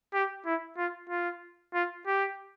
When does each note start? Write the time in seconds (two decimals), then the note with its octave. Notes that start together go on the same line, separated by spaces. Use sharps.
0.14 G4
0.46 E4
0.77 F4
1.10 F4
1.74 F4
2.07 G4